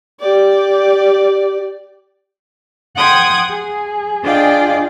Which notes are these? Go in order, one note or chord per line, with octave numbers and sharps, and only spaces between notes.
G4 D5
F#5 G5 C6 D#6 G#6
G#4
D4 F4 G#4 D5 D#5 G5